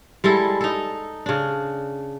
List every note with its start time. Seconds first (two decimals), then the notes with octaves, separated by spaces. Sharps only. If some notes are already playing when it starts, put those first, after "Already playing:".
0.24 G3 G#3 E4 A4
0.61 D#4 A4
1.26 C#3 D4